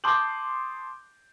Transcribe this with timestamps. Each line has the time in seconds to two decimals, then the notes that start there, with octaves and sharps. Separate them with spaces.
0.04 A5 C6 D6 D#6 G6 F#7